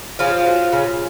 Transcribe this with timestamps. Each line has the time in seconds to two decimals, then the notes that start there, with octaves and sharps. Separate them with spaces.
0.19 C#3 F3 F4
0.46 F#3
0.72 C#3